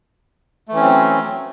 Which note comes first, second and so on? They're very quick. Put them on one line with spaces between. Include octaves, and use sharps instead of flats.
A3 E3 C#4 C4 F#3